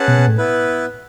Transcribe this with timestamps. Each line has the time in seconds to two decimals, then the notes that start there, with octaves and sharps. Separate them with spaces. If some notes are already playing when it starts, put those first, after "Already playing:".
Already playing: C#4 G#4 B4 F#5 A5
0.08 B2
0.18 B2
0.28 A2
0.38 B3 E4 B4